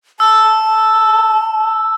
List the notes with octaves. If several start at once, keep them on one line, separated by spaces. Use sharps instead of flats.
A5 E6